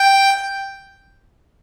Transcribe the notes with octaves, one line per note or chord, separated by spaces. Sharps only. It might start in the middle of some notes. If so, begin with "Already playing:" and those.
Already playing: G5